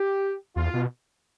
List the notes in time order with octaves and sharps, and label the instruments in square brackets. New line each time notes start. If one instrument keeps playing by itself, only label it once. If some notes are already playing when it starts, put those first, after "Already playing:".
Already playing: [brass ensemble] G4
[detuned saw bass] E2 [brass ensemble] F4
[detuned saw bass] B2